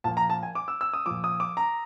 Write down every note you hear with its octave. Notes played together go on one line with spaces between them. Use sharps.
A#2 F3 A5
A#5
A5
G#5
D6
E6
E6
D#6
A#2 F3 D6
D#6
D6
A#5